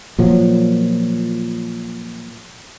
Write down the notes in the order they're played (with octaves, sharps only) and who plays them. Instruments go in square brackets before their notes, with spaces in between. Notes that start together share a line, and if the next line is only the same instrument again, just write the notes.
[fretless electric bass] A#2 F3 F#3